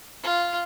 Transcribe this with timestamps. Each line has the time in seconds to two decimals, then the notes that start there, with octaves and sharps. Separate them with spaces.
0.23 F4